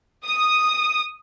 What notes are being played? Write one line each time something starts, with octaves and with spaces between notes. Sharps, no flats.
D#6